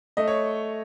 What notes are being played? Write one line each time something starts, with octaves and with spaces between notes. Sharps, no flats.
A3 D#5
C#5